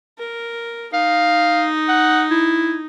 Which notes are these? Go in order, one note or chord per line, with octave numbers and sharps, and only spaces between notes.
A#4
D#4 F5
F#5
E4